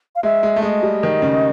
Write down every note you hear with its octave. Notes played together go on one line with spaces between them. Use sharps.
F5
G#3 E5
G#3
A3
G#3 D#5
G3
D#3
C#3